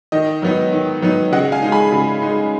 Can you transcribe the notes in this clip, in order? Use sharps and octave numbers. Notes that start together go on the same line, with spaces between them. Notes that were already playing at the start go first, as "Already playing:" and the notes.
D#3 D#5
F#3 B3 D#4
D#3
F#3 B3 D#4
C#3 D#5 F#5
F5 G#5
G#3 D#4
G#5 B5
C#3
G#3 D#4